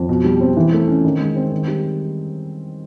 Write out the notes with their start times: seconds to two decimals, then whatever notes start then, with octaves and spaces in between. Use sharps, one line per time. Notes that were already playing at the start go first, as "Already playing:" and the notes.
Already playing: F2
0.09 B2
0.24 G3
0.41 C4
0.57 E3
0.73 A3
0.88 C#4
1.04 D#3
1.20 G#3
1.36 C4
1.52 D#3
1.68 G3